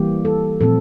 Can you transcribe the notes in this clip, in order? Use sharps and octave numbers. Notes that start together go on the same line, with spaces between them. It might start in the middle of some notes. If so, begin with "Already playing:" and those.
Already playing: E3 G3 A#3 G4
A4
A#2 F3 A3 C4 A4